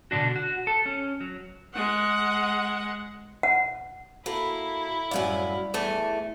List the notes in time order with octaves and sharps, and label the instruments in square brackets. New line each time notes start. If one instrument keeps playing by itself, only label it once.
[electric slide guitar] B2 D3 D#3 D4 F#4
F#4
A4
C#4
F#3
[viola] G#3 F#5
[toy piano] F#5
[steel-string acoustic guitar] A#3 [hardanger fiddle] E4 [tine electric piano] F#4 A4
[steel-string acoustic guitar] F#2 A2 F5 [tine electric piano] G3 D5
[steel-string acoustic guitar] E2 E3 A3